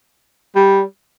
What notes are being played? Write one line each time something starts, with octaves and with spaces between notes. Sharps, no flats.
G3